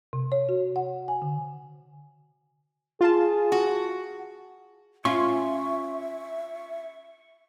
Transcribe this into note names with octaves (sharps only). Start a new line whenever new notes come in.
C3
C#5
F#4
F#5
G#5
D3
F4 G#4 A5
F#4
C#4 F4 E5 C#6